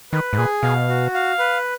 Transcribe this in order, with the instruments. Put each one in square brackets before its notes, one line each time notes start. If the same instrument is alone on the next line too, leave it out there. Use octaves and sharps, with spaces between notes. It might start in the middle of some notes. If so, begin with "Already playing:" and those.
[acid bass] D#3 [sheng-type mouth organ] B4
[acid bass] G#2
[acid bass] A#2 [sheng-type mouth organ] G#4
[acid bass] B2 [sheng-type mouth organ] F5
[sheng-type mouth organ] F#4
F5
B4